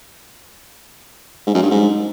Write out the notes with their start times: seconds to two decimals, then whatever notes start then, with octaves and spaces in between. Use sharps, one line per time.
1.47 G#2
1.55 F#2
1.63 G2
1.71 G#2